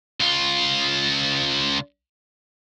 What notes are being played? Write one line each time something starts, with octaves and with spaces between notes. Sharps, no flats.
C#2 F4